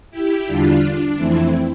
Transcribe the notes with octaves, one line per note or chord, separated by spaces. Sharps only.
E4 G4
E2 D3 G3 D4 F4
D4
F2 E3 A3 C4 E4